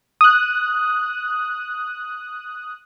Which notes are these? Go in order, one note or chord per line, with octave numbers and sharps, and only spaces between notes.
D#6 F#6